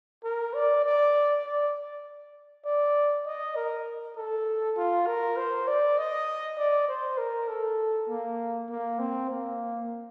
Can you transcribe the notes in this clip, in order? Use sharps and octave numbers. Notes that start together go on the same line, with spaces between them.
A#4
D5
D5
D5
D5
D#5
A#4
A4
F4
A#4
C5
D5
D#5
D5
C5
A#4
A4
A#3
A#3
C4
A#3